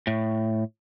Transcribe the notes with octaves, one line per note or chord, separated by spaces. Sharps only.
A2